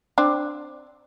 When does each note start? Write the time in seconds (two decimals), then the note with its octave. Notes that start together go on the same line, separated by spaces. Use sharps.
0.18 C4 D4